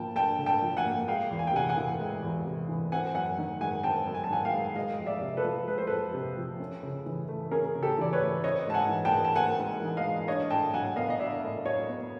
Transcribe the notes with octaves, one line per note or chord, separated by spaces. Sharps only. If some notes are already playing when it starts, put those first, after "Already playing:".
Already playing: D3 F3 A#3 G5 A5
D4 G5 A5
D3
G5 A5
F3
F#5 G#5
A#3
G#3 F5 G5
E2
G#5
G5
C3 F#5 G#5
F#5 G#5
E3
G#3
E2
C3
E3
C4 F#5 G#5
F#2 F#5 G#5
D#3
G#3 F#5 G#5
C4 G5 A5
F#2
G#5
A5
D#3 F#5 G#5
F5 G5
G#3
G#3 D#5 F5
F2
D5 E5
C3
A4 B4
F3
G#3 B4
C5
F2 A4 B4
C3
F3
C#4
C#3
E3
A3
C#4 G#4 A#4
C#3
G4 A4
E3 D5
B4 C#5
A3
C4 C#5 D#5
G#2 A5
F#5 G#5
E3
G5 A5
G#3
A5
C4 F#5 G#5
G#2
E3
D#5 F5
G#3
D4 C#5 D#5
A2 G5 A5
F#3 F#5 G#5
B3 D#5 F5
D#5
D4 D5 E5
A2
F#3 C#5 D#5
B3